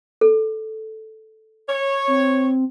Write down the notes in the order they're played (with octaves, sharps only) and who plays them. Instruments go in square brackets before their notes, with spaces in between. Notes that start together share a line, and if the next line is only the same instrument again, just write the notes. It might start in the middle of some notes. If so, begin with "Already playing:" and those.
[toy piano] A4
[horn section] C#5
[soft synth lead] C4